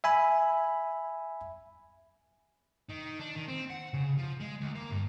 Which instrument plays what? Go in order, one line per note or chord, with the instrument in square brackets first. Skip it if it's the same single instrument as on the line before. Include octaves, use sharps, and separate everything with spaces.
[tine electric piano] E5 G#5 B5
[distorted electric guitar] D#3
D4
D#3
C4
F#5
C#3
F3
G#3
D2
A#3
G2